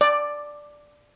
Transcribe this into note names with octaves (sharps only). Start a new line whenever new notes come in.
D5